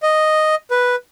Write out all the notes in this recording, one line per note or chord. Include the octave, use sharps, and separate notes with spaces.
D#5
B4